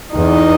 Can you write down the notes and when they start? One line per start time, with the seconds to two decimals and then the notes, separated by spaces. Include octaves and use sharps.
0.15 E2 D#4